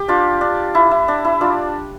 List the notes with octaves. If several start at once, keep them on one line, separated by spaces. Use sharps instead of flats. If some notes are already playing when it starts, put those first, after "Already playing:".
Already playing: G4
D4 F4
D4
E4
E4
D4
E4
D4 F4